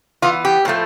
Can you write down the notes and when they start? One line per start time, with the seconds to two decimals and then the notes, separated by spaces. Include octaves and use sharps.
0.22 E3 B3 F4
0.45 G4
0.65 A2 F3 A3